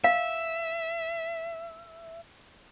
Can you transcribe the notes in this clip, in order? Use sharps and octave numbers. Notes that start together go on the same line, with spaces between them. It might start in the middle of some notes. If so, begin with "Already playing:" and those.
E5 F5